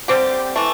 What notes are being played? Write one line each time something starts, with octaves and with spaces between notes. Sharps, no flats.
D3 G3 C4 G4
E3 A3